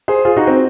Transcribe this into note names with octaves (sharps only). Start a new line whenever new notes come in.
G#4 C5
F4 G#4
D#4 F#4
C4